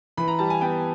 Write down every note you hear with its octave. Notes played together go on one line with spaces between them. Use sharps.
E3 B5
A#5
G3 A5
G#5
B3 G5